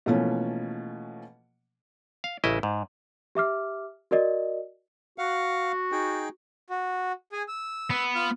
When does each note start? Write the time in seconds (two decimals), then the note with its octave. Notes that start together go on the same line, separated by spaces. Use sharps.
0.06 B2 E3 F3 A3 A#3 C#4
2.24 F5
2.44 A1 C#3 E4 D#5
2.63 G#2
3.35 G4 E5 D6 F6
4.11 F#4 A#4 D5 D#5
5.18 F#4 F5 F#5
5.92 D#4 G#4 G5
6.70 F#4
7.32 G#4 G#5
7.48 E6
7.90 B3
8.15 F4 F6